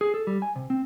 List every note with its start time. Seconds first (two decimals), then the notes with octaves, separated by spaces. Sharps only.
0.01 G#4
0.14 A4
0.27 G3
0.42 G#5
0.56 C3
0.70 C4